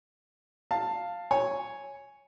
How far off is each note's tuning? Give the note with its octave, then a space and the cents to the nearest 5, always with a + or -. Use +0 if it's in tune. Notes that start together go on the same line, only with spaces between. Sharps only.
F5 +0 A5 +15
C#5 +0 G#5 +0